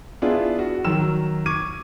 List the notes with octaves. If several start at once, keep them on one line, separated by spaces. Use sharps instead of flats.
B3 D4 E4 F4 G#4
F#4
D#3 F#3 E6 E7
C#6 D6 G#6 D#7